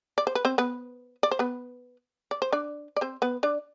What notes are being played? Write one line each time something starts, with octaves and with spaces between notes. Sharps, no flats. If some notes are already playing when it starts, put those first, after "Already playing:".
D5
C5
B4
C4 C5
B3 B4
D5
C5
B3 B4
D5
C5
D4 D5
D5
C4 C5
B3 B4
D4 D5